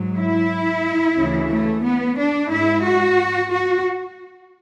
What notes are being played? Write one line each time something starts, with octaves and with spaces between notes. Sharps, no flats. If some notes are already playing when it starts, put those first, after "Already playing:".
Already playing: G#2 F#3
E4
D2 C#3 E3
A3
B3
D4
G#2 G#3 E4
F#4
F#4